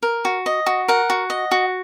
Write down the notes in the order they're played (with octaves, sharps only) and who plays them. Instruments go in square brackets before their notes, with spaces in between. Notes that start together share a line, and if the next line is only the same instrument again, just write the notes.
[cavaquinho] A#4
F#4
D#5
F#4
A#4 F#5
F#4
D#5
F#4